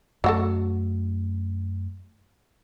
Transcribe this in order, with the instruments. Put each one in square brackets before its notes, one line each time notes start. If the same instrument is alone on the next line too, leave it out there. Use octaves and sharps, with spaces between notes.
[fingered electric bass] F#2 A3 [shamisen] F#3 F#4 A4